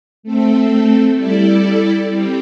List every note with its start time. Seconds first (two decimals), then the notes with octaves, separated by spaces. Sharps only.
0.23 A3 C4 A4
1.16 G3 E4 A4 D5
2.08 G3 C4 G4